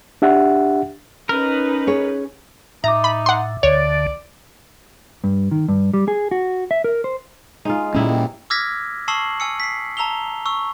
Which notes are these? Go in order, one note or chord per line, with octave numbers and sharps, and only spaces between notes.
D4 G4 E5 F#5
C#4 D#4 A#4 B4
G#4 C#5
A2 D#4 E5 A#5 D6
B5
F#5 C6
D2 D3 C#5 D5
G2
D#3
G2
G3
G#4
F#4
E5
A#4
C5
G#3 D#4 F4 G#4
A#2 F#3 G3 C#4 D#4 E4
A#3
D6 E6 F6 G#6 A#6 B6
A5 C#6 D#6 E6 C7 F#7
G#5 E6 C#7
B6 C7
A5 A#5 E6 F7 G7
C#6 E6